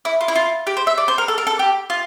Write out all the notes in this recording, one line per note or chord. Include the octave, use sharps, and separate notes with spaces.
E4
F4
E4
F4
G4
C5
E5
D5
C5
A#4
A4
A#4
A4
G4
F4